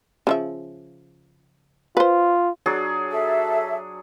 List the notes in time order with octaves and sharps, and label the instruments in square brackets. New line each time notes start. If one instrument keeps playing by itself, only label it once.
[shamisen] C#3 F3 E5
[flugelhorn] F4 [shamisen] B4 C5
[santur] F#3 D4 G#4
[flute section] A4 E5